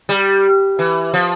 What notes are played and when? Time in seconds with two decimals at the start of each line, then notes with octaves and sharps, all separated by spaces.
0.09 G3
0.79 E3
1.13 F3